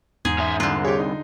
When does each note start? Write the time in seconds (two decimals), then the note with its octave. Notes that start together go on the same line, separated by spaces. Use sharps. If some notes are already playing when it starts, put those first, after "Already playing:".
0.25 E2 G#2 G#4
0.39 C#4 E5
0.60 C2 D3 F4
0.84 G4 G#4 C#5
0.99 D#4